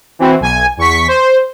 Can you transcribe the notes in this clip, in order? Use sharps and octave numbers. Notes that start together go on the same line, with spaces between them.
E3 C4 F#4
B1 G#5
E2 C#6 B6
C5